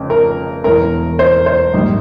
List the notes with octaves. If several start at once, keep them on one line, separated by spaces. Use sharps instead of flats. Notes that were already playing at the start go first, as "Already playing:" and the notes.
Already playing: F1 F2 C#3
A#4
E1 E2 E3 A#4
C5
C5
A#1 G#2 G3